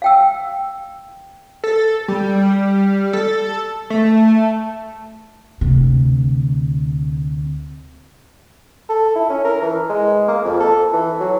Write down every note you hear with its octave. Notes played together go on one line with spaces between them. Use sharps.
F5 G5 E6
A4
G3
A4
A3
D2 C3
A4
E4
C#4
A#4
E3
G#3
A#3
F2
A4
E3
F#3